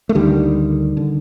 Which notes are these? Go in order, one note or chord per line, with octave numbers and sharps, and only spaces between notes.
A3
D2 D3 D#3 G3
D3